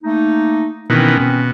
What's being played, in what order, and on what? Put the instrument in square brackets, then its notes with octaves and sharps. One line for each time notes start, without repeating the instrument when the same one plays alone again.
[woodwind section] A3 A#3 D#4
[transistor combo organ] B2 D#3 E3 [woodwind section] C4 C#4
[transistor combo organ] B2